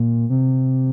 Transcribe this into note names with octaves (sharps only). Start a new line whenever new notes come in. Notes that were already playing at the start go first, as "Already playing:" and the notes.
Already playing: A#2
C3